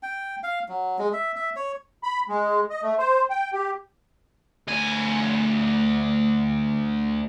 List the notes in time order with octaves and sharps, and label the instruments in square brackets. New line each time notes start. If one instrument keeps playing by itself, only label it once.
[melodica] G5
F5
F#3
G#3
E5
E5
C#5
[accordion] B5
G#3
D#5
A3
C5
G5
G4
[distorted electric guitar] D2 G#5